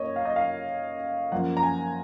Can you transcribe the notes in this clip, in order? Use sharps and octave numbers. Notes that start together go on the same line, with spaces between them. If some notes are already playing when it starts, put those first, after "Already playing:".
Already playing: F#2 A#3 C#5 D#5
F5
D#5
F5
F#2 F3 A#3 F#5
A#5
G#5